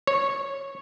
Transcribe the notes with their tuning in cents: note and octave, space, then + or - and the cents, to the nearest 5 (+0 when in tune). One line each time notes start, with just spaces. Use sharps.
C#5 -10